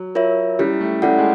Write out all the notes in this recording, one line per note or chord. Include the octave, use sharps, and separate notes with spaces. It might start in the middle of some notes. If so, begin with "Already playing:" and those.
Already playing: F#3
F4 A#4 C#5 E5
G3 C#4 E4 G4
A3
G3 C#4 E4 A4 D5 F#5
G#3